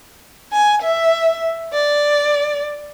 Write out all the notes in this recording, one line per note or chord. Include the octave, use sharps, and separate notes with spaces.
G#5
E5
D5